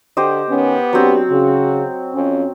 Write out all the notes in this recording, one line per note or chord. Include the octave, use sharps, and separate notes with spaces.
D3 G4 C5 D#5
D#3 B3 C#4
F#3 C4 D4 G4
C#3 F#4
F2 C#4